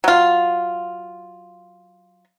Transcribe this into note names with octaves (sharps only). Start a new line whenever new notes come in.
F#3 F4